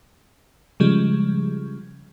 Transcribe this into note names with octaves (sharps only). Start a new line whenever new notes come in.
C#3 F3 G3 G#3